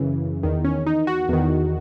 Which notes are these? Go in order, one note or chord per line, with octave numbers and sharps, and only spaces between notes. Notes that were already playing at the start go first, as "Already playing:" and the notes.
Already playing: F#2 C#3 E3
E2 D#3
C#4
D#4
F#4
E2 D#3